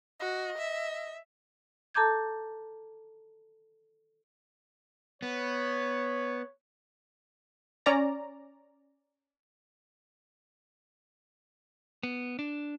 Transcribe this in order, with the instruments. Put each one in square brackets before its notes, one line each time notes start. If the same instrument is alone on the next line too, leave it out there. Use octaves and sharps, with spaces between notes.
[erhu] F#4 [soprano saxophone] D#5
[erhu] E5
[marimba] A4 A5 A#5 D6 G6 G#6
[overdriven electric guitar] B3 [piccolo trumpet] C#5
[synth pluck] C#4 D5 A#5
[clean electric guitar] B3
D4